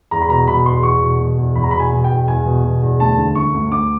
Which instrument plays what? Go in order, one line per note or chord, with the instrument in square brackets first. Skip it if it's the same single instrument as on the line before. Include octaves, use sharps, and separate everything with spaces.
[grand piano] E2 A#5
B5
B2 A#5
B2 B5
E2 C6
E2 C#6
B2
B2
E2
E2 B5
A#5
B5
B2
G#5
B2
G5
E2
E2 G#5
B2
B2
E2
D2 A5
D3
D3 C#6
D2
D2 D6